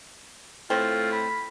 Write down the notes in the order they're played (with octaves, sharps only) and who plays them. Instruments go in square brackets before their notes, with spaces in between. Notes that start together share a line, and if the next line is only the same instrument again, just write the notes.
[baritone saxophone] A2 [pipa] C4 [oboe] F4
[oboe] B5